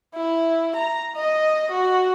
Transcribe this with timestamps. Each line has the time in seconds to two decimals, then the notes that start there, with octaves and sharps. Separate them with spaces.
0.15 E4
0.76 A#5
1.16 D#5
1.71 F#4